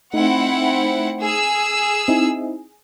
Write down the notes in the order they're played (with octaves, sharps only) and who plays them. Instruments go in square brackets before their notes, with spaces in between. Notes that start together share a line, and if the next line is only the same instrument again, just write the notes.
[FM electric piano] A3 D#4 [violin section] C4 E4 F#5
[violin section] G#4 E6
[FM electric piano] C4 D#4 E4